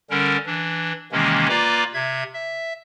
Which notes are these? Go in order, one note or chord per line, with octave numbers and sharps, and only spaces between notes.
D3 G3 C#4 A#4
E3 D4
C3 D#3 E3 G#3 A#3 C#4
A#3 F4 B4 D5 A#5 D6
C3 E5 G#6
E5